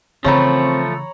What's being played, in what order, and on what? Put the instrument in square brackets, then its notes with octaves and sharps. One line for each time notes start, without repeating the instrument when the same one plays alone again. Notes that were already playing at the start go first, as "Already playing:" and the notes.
[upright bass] C#3 E3 [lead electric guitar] F3 A3 [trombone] C4 [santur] C#5 A#5 B5